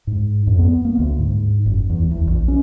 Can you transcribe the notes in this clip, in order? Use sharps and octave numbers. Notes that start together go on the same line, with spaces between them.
G#2
F2
B3
A#3
D2
G#2
F#1
E2
E2
A#1
C#4